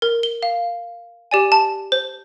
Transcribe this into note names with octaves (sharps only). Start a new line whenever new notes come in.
A#4
G7
F5
G4 D5 G#5
A5
C5